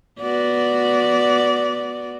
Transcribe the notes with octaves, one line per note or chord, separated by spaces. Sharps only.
B3 F#4 D5